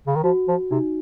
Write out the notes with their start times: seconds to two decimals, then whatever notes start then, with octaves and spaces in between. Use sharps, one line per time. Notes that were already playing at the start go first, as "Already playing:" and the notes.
0.07 C#3
0.16 D#3
0.24 F3 F#4
0.48 F3
0.71 C3 D#4